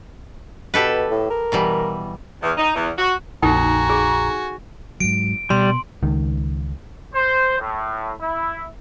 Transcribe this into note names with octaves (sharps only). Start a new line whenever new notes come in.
B2 G4 A4 B4
A2
A#4
B2 E3 G3
E2
D#4
E2
F#4
A#1 F2 D#4 F#4 A4 G5 G#5 A#5
G#4
G#2 F#3 D7
B2 G3 C6
C#2 D#3
C5
A2
E4